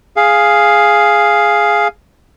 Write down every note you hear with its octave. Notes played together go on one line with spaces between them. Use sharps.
G#4 F5